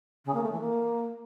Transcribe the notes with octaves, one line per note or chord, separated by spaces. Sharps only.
C#3
A#3
A3
E3
A#3